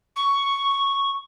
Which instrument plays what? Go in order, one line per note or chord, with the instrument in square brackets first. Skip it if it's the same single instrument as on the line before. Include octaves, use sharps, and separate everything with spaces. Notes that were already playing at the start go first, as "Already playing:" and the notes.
[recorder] C#6